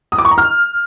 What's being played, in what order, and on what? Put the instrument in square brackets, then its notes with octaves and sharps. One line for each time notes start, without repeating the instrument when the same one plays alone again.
[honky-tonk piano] D#6
D6
C#6
A#5
F6